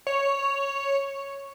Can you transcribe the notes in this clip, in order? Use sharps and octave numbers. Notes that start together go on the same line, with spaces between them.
C#5